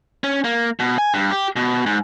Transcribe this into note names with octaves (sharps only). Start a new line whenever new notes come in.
C#4
A#3
B2
G#5
G2
G4
B2
G#2